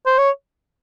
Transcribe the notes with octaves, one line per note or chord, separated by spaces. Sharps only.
C5
C#5